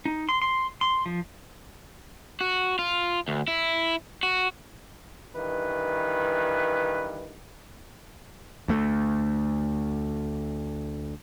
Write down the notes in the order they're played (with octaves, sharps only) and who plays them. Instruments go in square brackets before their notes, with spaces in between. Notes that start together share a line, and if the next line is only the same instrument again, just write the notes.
[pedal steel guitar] D#4
C6
C6
C6
F3
[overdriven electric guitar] F#4
F4
D2
E4
F#4
[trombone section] G2 D#3 E3 B4
[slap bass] D2 A3